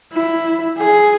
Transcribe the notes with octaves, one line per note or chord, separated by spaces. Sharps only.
E4
G#4